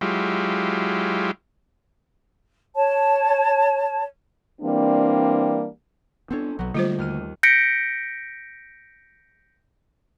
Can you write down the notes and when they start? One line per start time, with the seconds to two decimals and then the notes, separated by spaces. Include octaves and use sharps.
0.01 F#3 G#3 E4 F4 G4
2.75 C#5 A5
4.62 E3 G3 A#3 C4 D4
6.31 B3 C4 D4 A4 C#5
6.59 B1 F#3 B3
6.74 D3 G3 A3 A#3 F4 G4 C5
6.98 D#2 F6 D#7
7.43 G6 A#6 B6 C#7 D7